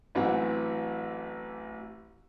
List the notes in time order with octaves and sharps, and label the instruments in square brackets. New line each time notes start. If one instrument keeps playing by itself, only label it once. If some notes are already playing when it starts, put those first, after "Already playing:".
[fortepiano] A1 E3 F#3 C4 F#5